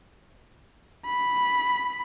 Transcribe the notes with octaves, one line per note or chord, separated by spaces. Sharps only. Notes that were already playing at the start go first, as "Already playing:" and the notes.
B5